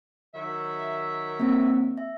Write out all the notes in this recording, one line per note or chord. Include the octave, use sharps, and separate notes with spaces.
D#3 F#3 E5
A#3 C4
E5